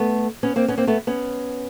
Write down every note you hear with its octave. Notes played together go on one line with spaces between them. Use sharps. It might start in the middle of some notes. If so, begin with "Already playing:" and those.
Already playing: A3 B3
B3 C#4
A#3 C4
B3 C#4
A#3 C4
A3 B3
B3 C#4